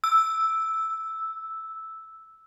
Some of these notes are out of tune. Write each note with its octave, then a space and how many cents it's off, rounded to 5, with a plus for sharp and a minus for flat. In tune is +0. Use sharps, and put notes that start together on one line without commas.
E6 -5